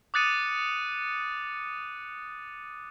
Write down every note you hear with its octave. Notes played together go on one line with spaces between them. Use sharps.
D6 D#6 F#6 A6 C#7 D#7